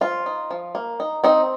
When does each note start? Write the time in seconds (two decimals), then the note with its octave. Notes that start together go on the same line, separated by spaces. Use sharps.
0.01 F3 F4
0.26 D#4
0.51 F3
0.75 A#3
1.00 D#4
1.24 C4 D#4